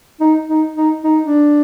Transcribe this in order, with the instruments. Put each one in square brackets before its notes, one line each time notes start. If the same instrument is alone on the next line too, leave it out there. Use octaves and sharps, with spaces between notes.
[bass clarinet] D#4
D#4
D#4
D#4
D4